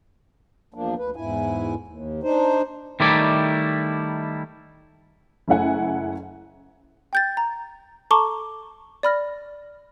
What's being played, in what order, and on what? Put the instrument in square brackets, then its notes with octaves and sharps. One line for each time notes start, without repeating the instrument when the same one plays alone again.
[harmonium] E2 F3 A#3 D4
D2 B4
E2 G#2 E4 G#5
D#2
D4 D#4 C5
[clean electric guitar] D#3 G3 A3 D#4 E4 D5
[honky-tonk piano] F#1 A3 E4 F#5 G#5
[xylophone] G5 G6 A6
A#5
A4 A5 A#5 C#6 D6 G7
D5 B5 F6 A#6